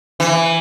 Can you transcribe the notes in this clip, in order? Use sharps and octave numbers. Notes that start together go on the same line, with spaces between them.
E3